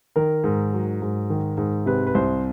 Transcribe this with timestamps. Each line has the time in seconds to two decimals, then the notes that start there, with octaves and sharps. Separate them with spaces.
0.16 D#3 A#4
0.44 G#2
0.73 F#3
1.02 G#2
1.30 D#3
1.58 G#2
1.86 C3 B4
2.07 B4
2.15 C2 C5